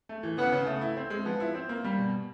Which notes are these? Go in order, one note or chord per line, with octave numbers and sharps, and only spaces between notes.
A3
E3
C#3 B3
C#3
A3
E4
C4
G#3
F3 B3
E4
C4
A#3
G3
B2